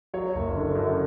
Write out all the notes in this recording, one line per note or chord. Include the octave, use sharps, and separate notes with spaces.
F#3 C#5
F#1
D3
F#2